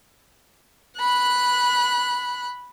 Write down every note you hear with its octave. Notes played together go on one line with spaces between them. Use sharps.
B5 F#6